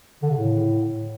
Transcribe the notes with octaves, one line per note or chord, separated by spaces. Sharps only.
D3
C#3
A2